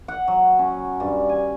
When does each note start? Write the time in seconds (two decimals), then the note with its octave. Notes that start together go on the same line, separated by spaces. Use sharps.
0.08 F#5
0.28 F#3
0.59 C#4
1.00 G2
1.29 G#5